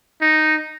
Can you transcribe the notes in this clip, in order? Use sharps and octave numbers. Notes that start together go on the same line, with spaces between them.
D#4